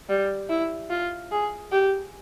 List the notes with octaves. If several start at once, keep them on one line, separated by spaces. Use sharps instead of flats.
G3
E4
F4
G#4
G4